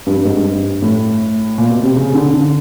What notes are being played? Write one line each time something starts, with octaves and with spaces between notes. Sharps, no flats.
G2
G2
G#2
G2
A2
A#2
B2
C3
C#3
D3
D3